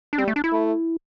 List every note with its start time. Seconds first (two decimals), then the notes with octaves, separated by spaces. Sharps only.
0.13 D4
0.18 G3 C4
0.28 A3
0.36 D4
0.44 E4
0.52 A3